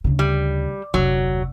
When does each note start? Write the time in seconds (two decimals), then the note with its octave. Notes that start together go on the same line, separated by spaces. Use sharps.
0.04 D2 C#3
0.19 G3
0.94 F1 D2 F#3